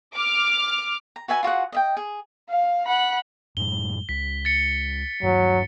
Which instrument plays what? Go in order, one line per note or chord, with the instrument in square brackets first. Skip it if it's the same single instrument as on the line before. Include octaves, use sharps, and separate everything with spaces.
[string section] D6 F6
[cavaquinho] A#5
F#4 B4 E5 G#5
F4 F#4 G#4 F#5
D#5 E5 G5
G#4
[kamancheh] F5
F#5 B5
[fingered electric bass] F#2 A2 G3 [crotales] G7
[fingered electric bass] C#2 [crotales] B6
[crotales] A6 C#7
[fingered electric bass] D#1 G2 [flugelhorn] F#3